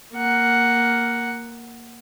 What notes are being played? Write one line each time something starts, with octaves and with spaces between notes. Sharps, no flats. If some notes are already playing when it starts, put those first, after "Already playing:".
A#3 F#5